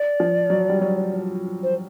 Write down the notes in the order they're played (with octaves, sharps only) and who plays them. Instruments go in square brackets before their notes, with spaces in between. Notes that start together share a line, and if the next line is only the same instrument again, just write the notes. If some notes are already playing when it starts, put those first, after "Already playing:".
Already playing: [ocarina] D5
[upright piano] F3
F#3
G3
F#3
[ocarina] C5